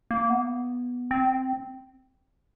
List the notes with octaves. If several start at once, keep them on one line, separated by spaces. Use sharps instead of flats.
A#3
B3
C4